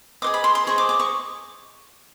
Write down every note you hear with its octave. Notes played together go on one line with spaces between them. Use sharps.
G#4 C5 D#5 D6
B5
C6
C6
G#4 C5 D#5 C#6
D6
D6
C#6